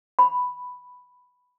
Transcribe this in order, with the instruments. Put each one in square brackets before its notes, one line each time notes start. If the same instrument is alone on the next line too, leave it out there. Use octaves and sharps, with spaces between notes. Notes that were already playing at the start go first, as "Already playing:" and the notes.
[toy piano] B5